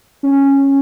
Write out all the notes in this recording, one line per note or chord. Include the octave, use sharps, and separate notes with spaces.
C#4